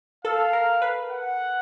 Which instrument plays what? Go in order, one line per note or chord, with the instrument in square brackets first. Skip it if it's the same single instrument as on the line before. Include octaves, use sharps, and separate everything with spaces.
[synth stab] A4 [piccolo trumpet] F5
[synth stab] A#4
B4
[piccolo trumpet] F#5